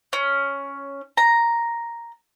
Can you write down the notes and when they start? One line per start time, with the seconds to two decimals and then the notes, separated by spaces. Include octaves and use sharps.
0.13 C#4
1.17 A#5